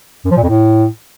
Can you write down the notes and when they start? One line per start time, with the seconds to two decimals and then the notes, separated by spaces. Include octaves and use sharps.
0.25 F#2
0.31 F3
0.37 A#2
0.43 F2
0.49 A2